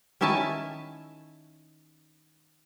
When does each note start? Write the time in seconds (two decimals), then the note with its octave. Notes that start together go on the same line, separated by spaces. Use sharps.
0.21 D#3 C#4 E4 E5 G#5 A5